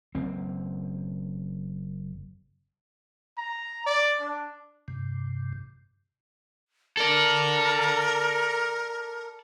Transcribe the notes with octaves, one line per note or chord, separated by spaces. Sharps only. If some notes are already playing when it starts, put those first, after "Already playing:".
F#1 C4
A#5
D5
D4
G2 C3
A4 A#4 D5